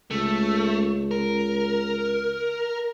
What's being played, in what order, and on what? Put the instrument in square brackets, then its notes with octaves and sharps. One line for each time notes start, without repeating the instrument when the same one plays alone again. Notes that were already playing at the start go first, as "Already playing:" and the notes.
[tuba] C#2 [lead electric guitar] A3
[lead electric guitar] A#4